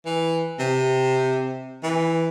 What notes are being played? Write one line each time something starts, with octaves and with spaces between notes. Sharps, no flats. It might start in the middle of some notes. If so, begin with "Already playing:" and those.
E3
C3
E3